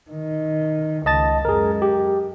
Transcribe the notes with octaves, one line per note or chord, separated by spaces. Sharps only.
D#3
C#2 D#5 A5 A6
F#2 G#3 G#4 A#4
G4